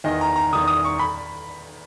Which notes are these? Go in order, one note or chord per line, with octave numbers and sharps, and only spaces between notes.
E2 D#3 D#5
A#5
A#5
E2 D#3 D#6
D#6
C#6
B5